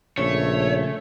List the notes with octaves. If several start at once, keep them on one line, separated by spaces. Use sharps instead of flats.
A#1 C#3 A3 C#5